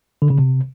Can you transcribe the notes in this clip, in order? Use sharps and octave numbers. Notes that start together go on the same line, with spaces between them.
D3
C#3
C3